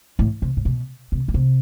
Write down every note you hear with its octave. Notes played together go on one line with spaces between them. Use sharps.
A2
C3
A2
B2
C3
B2
C3